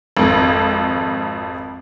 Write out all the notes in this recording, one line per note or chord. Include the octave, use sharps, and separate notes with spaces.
G#1 F2